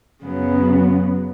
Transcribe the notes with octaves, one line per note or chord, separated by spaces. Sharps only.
F#2 C#3 F#3 B3